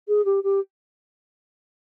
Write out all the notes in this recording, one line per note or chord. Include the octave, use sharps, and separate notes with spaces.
G#4
G4
G4